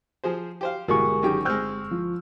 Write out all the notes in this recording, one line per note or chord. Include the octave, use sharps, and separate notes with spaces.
F3 G#4 C5
G4 C5 F5
G1 B2 E3 G#3 A#3 G4 A#4 C#6
F#2 D#3 G4 G#4 G5
G#3 C4 E6 F6 G6
F3